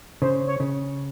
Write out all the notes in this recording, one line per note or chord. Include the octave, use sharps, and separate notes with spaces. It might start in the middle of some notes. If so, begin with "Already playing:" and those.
C#3 C5
C#5
C#3